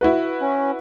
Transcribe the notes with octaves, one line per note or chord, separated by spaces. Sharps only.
E4 F#4 B4
C#4